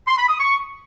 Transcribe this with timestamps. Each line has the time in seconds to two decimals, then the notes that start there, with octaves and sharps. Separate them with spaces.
0.08 C6
0.18 B5
0.28 D#6
0.39 C#6